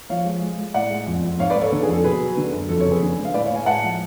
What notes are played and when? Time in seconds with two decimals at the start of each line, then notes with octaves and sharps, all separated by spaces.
0.10 F3 C#5 F5
0.25 G#3
0.42 G#3
0.58 G#3
0.74 A2 D5 F#5
0.91 G#3
1.07 F2
1.23 F2
1.39 G#2 C#5 F5
1.50 B4 D5
1.55 G#2
1.61 A4 C#5
1.72 D3 A4
1.83 G#4
1.88 F2
1.93 A4
2.04 B2 G#4 B4
2.21 F#3
2.37 D3
2.53 F#2
2.69 F2 A4
2.80 A4 C#5
2.85 C#3
2.91 G#4 B4
3.02 D3
3.18 G#3
3.25 F5
3.34 A2 B4 D5
3.45 C#5 F5
3.50 A2
3.56 F5 G#5
3.66 G#3 F#5 A5
3.82 F3